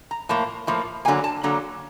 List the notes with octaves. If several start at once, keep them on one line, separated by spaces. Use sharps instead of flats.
A#5
A2 F3 A#3 A5
A2 F3 A#3
D3 F#3 A#3 G#5
A5
D3 F#3 A#3 A#5